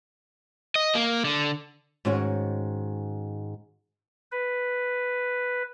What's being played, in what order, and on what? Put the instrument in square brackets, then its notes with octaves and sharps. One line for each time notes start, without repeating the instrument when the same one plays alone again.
[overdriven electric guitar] D#5
A#3
D3
[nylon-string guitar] G#2 D#3 C#4 F#4 C#5
[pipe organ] B4